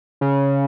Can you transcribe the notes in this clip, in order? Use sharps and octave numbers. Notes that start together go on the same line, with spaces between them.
C#3